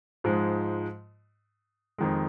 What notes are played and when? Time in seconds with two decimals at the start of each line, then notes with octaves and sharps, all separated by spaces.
0.24 G#2 F3 G#3
1.98 F2 D#3 G#3